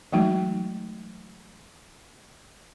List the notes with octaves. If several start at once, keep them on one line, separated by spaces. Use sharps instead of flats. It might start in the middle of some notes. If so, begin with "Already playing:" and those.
E3 F#3 G#3 A3 D#4 F#4